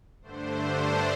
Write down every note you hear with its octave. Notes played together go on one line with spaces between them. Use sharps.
G2 D3 A3 D4 C5